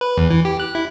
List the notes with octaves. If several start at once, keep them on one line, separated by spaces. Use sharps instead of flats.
B4
E2
E3
G4
F#6
E4